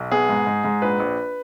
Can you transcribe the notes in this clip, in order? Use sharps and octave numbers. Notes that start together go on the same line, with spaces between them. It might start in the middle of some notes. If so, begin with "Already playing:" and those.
Already playing: B1
B3 G#4
G#2
G#2
G#2
A#1 B4
A#1